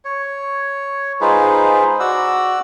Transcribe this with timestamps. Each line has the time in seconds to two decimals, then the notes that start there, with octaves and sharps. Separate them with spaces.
0.05 C#5
1.21 G#3 D#4 F4 G#4 B4 C5
2.00 F#4 D5 F#5 E6